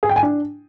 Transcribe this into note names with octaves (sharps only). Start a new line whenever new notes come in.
G#4
G5
G#5
D4